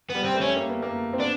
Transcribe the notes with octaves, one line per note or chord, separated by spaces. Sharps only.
G3 B3
C4
A3
C#4
A#3
B3
A#3
C4
B3 D4